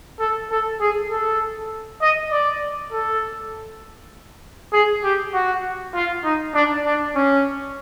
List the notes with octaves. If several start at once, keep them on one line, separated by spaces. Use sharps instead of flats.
A4
A4
G#4
A4
D#5
D5
A4
G#4
G4
F#4
F4
D#4
D4
D4
C#4